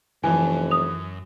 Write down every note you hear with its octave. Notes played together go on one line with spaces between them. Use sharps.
F1 F#2 E3 F3 G#5
D#6 F7